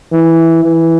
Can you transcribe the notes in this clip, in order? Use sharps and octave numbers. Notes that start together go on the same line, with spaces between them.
E3
E3